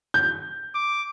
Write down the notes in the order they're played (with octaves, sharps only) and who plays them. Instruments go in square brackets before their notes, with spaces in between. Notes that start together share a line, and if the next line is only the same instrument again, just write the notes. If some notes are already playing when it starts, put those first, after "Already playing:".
[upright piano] G6
[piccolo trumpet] D6